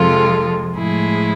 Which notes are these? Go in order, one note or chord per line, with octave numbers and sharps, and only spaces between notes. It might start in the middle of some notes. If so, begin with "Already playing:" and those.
Already playing: F2 C3 F3 G#3 F4 A4
A2 F3 G#3 E4 G#4